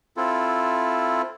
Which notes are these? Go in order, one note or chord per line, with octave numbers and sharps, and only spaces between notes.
C4 E4 F4 A4